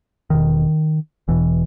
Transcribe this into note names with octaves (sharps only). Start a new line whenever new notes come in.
E1 E2 B2 D#3
E1 E2 B2 E3